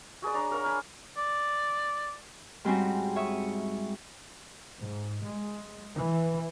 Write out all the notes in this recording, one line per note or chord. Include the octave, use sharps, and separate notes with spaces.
F#4 G#4 B4 D5
D4 C#5 A#5
F#4 A#4 F5
F5 G#5 B5 D6
D5
G#2 G3 G#3 C4 C#4 F#4
C#5 E5 C#6 D#6
G#2
G#3
E3